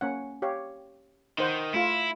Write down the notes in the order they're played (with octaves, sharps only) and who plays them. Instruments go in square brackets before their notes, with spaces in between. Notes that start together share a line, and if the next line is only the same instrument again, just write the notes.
[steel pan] A#3 C#4 F#5
G4 C#5 F5
[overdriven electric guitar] D#3 [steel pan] D#4 C5 F#5
[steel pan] A3 F4 [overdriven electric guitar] E4